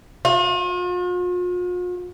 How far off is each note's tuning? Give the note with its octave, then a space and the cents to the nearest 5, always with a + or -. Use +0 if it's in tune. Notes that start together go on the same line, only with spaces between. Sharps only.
F4 +45